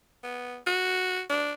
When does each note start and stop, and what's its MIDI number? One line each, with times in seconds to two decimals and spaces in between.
0.24 0.57 59
0.66 1.22 66
1.30 1.52 62